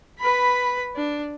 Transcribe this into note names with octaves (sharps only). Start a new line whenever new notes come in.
B4 B5
D4